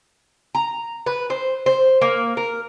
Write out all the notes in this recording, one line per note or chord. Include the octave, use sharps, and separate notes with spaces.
A#5
B4
C5
C5
A#3
A#4